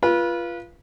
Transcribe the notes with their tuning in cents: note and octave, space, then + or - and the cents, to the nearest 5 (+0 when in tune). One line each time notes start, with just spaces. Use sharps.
F4 -15 B4 -25